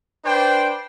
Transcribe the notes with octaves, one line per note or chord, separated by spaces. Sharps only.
D4 B4 C5 G5